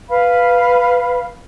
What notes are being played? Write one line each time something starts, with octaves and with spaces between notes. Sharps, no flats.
B4 F5 B5